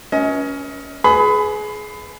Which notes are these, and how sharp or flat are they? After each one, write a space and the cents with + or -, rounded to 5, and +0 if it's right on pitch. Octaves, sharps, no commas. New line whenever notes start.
C#4 +15 B4 -30 D#5 +35
G#4 +25 B4 +0 B5 +25